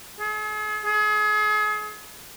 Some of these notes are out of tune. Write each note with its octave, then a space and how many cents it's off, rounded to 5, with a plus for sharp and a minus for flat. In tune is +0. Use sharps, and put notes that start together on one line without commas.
G#4 +40
G#4 +35